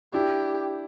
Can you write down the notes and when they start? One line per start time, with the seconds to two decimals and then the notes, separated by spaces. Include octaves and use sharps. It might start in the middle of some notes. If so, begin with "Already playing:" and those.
0.13 D4 E4 G4